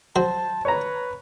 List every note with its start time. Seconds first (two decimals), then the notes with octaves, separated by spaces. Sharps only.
0.16 F#3 C5 A5
0.65 B4 C#5 A#5